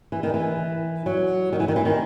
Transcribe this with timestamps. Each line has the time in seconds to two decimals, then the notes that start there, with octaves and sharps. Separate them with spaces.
0.12 E3
0.23 D#3
0.34 E3
1.06 F#3
1.53 D#3
1.60 E3
1.68 D#3
1.76 E3
1.85 D#3